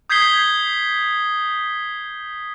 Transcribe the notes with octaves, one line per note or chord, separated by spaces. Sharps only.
D#6 G6 G#6 B6 C7 G7